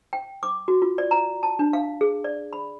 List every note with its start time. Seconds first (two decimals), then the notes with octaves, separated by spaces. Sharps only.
0.13 G5
0.43 D6
0.68 F#4
0.82 F4
0.98 D5
1.11 A#5
1.43 A5
1.59 D4
1.73 F5
2.01 G#4
2.24 D5
2.53 B5